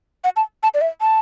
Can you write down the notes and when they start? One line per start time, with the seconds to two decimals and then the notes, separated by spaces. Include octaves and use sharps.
0.24 F#5
0.36 A5
0.63 A5
0.74 D5
0.81 E5
1.01 A5